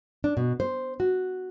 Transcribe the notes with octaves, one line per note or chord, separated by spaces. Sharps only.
D4
B2
C5
F#4